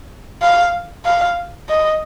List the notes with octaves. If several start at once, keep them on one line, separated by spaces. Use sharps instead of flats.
F5
F5
D#5